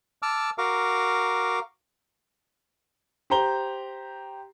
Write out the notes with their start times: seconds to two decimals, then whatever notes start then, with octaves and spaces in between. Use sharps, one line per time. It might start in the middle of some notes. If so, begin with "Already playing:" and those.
0.22 A5 D6 E6 F6
0.58 F#4 A#4 F5 D6
3.30 G4 C5 A#5 G7